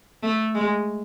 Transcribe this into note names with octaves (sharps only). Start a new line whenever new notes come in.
A3
G#3